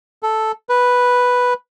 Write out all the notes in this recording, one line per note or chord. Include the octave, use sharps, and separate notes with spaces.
A4
B4